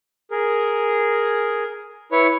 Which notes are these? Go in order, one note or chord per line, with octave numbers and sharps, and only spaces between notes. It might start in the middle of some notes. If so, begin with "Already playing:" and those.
G#4 A#4
E4 B4 C#5